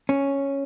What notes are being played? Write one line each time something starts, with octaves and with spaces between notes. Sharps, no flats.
C#4